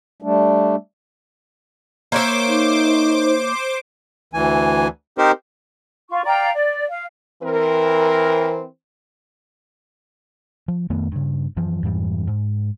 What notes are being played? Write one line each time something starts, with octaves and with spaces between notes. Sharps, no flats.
G3 A3 D4
A#3 C5 C#5 E5 D6
D#4
D2 E3 G#5
C4 D#4 G4 A#4 C5
F4 C#6
D5 F5 G5 A#5
D5
F5
E3 C4 A#4
F3
F2 D#3 A3 B3
G2 C#3
F#2 E3 F3
F2 G#2 E3 G3
G#2